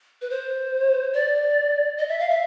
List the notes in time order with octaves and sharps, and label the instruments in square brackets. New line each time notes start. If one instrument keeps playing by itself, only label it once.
[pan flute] B4
C5
D5
D#5
E5
F5
E5